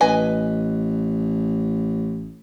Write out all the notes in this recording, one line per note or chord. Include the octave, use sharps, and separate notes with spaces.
A1 B4 D#5 G#5